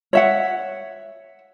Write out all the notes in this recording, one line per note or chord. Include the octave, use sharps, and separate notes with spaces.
C#5 E5 F#5